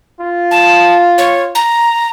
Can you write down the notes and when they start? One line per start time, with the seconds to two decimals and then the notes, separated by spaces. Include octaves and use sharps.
0.20 F4
0.51 A5
1.18 C#5
1.55 A#5